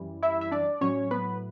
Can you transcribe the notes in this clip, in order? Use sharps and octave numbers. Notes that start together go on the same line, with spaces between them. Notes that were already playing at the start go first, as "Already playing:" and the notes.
Already playing: F#2 E3 G3
E4 E5
E5
D4 D5
A2 F#3 C#4 C#5
B3 B4